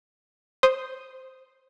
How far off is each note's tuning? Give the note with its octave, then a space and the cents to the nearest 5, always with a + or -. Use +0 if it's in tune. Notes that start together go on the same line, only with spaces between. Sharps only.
C5 +0 D#6 +0